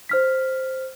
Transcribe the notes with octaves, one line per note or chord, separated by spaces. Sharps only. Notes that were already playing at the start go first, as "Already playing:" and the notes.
C5 F6 B6